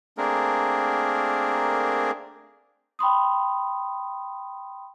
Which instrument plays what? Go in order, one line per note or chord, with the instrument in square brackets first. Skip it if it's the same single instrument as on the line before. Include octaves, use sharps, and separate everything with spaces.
[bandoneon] A3 A#3 C4 D4 G#4 A#4
[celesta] G5 B5 C6 D#6